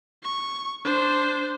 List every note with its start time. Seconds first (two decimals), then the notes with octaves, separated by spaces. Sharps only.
0.23 C#6
0.85 D4 C5